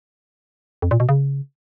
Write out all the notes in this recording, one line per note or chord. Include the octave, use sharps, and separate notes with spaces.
F2
A#2
B2
C#3